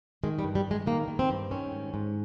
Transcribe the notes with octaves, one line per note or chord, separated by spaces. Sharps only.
D#3 G#3
G3
G2
G3
G2 G#3
D#3 A#3
D#3
C4
G2
D#3 C#4
G#2
G#2